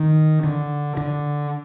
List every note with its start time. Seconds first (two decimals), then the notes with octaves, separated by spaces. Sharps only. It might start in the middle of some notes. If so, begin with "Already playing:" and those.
Already playing: D#3
0.44 D3
0.97 D3